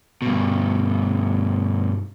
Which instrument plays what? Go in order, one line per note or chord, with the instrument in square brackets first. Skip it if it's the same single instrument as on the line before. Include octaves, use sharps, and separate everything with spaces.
[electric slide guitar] G2 B2